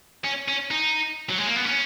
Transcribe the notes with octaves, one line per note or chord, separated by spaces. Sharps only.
C#4
C#4
D#4
F#3
G#3
A#3
B3
C#4